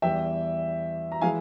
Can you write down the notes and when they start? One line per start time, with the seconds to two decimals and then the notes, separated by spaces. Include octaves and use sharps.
0.02 E2 E3 G3 E5 G5
1.12 A#5
1.21 E3 G#3 E4 F5 G#5